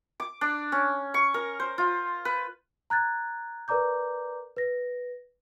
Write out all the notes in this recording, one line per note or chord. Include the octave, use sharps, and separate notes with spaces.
D6
D4
C#4
C#6
A#4
C5
F4
B4
A#5 F#6 G#6 A6
A#4 B4 D5 A#5 D6 G6
B4 A#6